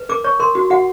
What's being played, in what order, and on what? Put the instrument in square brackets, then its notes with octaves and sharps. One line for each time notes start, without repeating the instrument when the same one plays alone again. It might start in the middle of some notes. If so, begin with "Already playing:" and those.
Already playing: [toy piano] B4
A#4 D6
C#5 C#6
A#4 C6
F#4
F#4 F#5